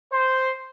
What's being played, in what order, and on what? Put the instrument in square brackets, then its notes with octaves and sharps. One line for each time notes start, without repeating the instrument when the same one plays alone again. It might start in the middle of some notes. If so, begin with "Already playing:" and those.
[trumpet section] C5